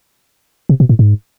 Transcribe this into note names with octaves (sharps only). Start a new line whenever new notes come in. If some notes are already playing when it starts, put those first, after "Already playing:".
C3
B2
A2
G#2